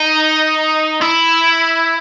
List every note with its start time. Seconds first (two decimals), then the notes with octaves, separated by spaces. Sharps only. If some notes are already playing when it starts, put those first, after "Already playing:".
Already playing: D#4
1.01 E4